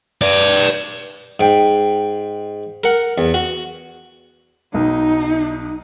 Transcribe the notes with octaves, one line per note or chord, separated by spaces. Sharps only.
B4 D5
G#2 G5
A#4 F#5
E2
F#4
B1 D#4